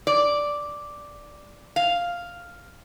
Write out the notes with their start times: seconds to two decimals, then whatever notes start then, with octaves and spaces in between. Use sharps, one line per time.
0.07 D5
1.76 F5